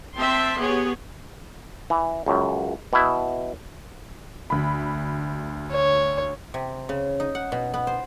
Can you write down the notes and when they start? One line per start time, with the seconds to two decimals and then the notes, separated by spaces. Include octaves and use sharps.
0.17 C4 E5 G5 A5 C6
0.59 B3 G4 G#4 C#5
1.90 E3
2.26 C#2 F#2
2.93 B2 E4
4.50 D2 B5
5.71 C#5
6.54 C3
6.89 C#3
7.20 D#4
7.35 F#5
7.52 B2
7.74 B3
7.87 C5